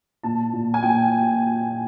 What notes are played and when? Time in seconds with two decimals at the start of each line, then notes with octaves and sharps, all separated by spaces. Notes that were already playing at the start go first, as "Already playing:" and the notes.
0.23 A#2 A5
0.53 A#2
0.74 G#5
0.83 A#2 G5